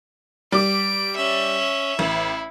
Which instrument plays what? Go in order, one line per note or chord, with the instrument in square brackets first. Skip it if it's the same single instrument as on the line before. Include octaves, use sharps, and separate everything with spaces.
[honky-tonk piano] G3 D6 [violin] D7
[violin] C#4 E5
[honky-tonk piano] A1 [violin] E4